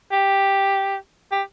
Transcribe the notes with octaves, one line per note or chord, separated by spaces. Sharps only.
G4
G4